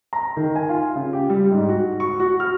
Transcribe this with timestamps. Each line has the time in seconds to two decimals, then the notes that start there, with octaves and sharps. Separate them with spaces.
0.13 A#5
0.37 D#3
0.55 G#5
0.69 F4
0.95 C#3
1.13 G4
1.30 G3
1.51 G#2
1.69 F#4
2.00 C#6
2.20 F#4
2.40 F6